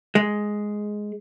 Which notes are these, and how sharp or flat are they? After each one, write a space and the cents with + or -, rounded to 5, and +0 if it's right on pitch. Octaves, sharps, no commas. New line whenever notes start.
G#3 +5